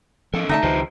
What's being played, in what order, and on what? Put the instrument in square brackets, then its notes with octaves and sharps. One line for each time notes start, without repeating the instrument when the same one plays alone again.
[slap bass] F3 [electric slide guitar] C#4 A4 A#4
[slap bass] D3 G3 A3 [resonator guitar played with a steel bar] D#4 E5 A5
[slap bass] C#2 D#3 F3 [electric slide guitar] G4 B4 C5